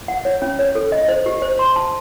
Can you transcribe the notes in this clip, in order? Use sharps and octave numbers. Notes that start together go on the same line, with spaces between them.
F#5
C#5
C#4
C#5
A4
D#5
C5
G4
C5
C6
A5